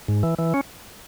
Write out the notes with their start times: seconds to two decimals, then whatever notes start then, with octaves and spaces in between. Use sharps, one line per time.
0.08 G#2
0.23 E3
0.39 E3
0.54 C#4